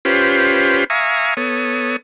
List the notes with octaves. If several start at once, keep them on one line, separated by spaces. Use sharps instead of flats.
C#4 F4 G4 B4 C5
E5 F5 G#5 A#5 C#6 D#6
B3 A4 C#5 D#6